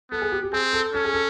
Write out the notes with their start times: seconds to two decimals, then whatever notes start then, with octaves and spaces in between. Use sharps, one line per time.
0.11 B3 A4
0.22 G#4
0.32 G4
0.43 G4
0.53 C4 G#4
0.73 A4
0.94 C#4 A4
1.05 G#4
1.14 A4